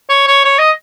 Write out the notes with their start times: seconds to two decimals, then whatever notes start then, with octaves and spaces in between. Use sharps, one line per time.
0.10 C#5
0.28 C#5
0.45 C#5
0.59 D#5